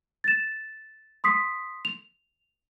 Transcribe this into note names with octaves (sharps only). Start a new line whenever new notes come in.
A6 E7
C6 D#6 B6 C7
F7